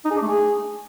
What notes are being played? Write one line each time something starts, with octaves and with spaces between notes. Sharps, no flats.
D#4
G#4
D4
A3
G#4